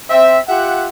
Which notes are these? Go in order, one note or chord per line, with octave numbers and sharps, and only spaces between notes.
C4 E5
F4 G4 E5 F#5